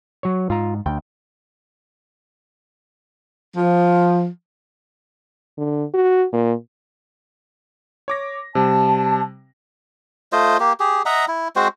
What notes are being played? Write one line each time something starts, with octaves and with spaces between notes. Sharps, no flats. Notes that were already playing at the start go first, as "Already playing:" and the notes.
F#3 C#5
G#2 F4 A#5
D2 G5
F3
D3
F#4
A#2
C#5 D6 A#6
C3 G3 A5
A3 F4 C5 D#5
A#3 G4
G4 G#4
D#5 E5 F#5 A#5
E4
G#3 C4 F#4 C5